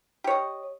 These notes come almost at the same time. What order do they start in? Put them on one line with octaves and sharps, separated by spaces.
G4 C#5 D#5